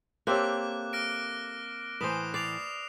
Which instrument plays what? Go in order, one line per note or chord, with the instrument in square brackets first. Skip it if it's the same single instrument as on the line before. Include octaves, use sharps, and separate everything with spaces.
[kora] A#3 C4 E5 [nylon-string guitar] G4 A4 C#5 [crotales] D6 F#6
[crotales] F6 A#6 D7
[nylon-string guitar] A2 E3 G#5 [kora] B4 C5 [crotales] D#6 E7
[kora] D5 [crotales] C7 F7